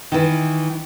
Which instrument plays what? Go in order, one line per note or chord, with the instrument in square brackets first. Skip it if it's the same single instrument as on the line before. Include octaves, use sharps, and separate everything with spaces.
[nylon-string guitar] D#3 E3